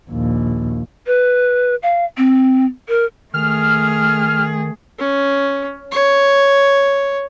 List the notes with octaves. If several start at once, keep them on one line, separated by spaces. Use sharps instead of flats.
A#1 D#2
B4
F5
C4
A#4
D#3 A3 G#4 F6
C#4
C#5